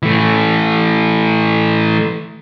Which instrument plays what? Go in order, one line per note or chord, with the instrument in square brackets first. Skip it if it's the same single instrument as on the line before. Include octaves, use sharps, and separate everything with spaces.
[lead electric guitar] E3 A3